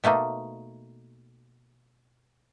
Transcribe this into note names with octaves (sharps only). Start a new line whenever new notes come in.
B2 A3 A#3 D#4